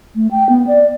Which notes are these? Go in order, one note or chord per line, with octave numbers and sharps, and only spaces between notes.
A3
G5
B3
D5